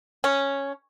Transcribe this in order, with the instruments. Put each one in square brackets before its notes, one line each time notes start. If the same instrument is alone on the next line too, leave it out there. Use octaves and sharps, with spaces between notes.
[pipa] C#4